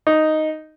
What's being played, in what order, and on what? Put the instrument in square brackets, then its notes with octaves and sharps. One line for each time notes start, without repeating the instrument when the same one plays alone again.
[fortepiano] D#4